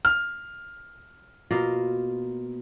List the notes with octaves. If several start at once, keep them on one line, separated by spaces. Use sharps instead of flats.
F6
B2 A#3 F4